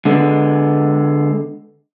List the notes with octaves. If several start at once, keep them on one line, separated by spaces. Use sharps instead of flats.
D3 G#3 B3